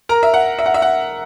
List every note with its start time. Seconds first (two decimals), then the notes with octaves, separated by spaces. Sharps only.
0.09 A#4 A#5
0.23 E5
0.34 F#5
0.59 E5
0.66 F#5
0.74 E5
0.82 F#5